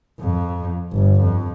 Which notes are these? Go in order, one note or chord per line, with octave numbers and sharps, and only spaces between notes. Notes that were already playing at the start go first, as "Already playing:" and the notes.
F2
G1
F2